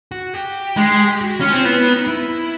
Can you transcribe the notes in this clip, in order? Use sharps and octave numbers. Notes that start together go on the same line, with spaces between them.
F#4
G4
G#3
F#4
C#4 F4
C4
B3 E4
D#4
E4